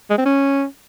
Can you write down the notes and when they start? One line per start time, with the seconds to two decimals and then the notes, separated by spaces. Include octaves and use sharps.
0.10 G#3
0.18 C4
0.25 C#4